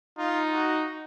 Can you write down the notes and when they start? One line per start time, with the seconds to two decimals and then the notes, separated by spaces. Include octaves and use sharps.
0.19 D#4 F4
0.53 F#4